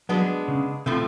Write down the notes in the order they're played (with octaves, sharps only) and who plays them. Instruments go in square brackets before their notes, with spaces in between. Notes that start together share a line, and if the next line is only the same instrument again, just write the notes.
[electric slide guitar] F#3 [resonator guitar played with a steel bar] G#3 B3 D4
[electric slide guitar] C#3
[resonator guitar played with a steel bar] A2 F3 A3 [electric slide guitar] C3